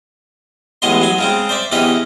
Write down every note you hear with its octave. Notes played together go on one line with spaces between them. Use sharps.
A1 A2 G#3 B3 D#5 C6
F#3 G#5
C#3 G#3 C4
C5 D5 E5
E2 C3 E3 C#4 B4 D#5